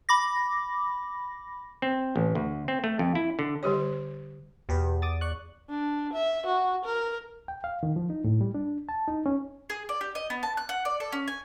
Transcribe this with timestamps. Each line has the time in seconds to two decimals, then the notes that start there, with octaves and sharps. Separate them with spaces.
0.09 B5 D6 A#6
1.82 C4
2.16 A1
2.35 D2
2.68 C4
2.84 A3
2.99 F2
3.15 E4
3.39 D3
3.63 D3 G3 G4 C#5
4.69 E2 B2 G4 B4
5.02 D6 D#6 A6
5.21 D5 C#6 F#6
5.70 D4
6.13 E5
6.46 F#4
6.85 A#4
7.48 G5
7.64 F5
7.83 D#3
7.96 F3
8.10 D#4
8.24 A2
8.41 G3
8.55 D4
8.89 A5
9.08 D#4
9.26 C#4
9.70 G#4
9.89 D5
10.01 G4
10.15 D#5
10.30 B3
10.43 A5
10.57 F#6
10.69 F#5
10.85 D5
11.00 A4
11.12 C#4
11.28 G#5